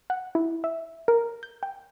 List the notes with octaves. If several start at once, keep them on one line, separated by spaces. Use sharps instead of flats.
F#5
E4
E5
A#4
G6
G5